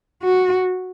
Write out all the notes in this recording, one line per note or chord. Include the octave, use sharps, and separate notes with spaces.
F#4